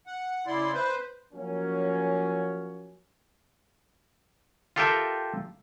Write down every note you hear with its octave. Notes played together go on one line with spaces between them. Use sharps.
F#5
C#3 E4 D5 C6
B4 C5
F3 F#3 A#3 C#4
F4 G4 A4 A#4 E5 G5